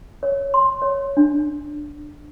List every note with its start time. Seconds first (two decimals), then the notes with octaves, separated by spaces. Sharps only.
0.23 C#5
0.54 C6
0.82 C#5
1.17 D4